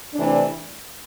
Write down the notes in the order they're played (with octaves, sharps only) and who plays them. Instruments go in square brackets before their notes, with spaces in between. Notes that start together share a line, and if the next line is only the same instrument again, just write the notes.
[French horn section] C3 E3 A3 D4